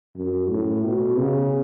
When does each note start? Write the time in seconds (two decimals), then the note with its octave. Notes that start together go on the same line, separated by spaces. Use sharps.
0.16 F#2
0.49 A2
0.84 B2
1.17 C#3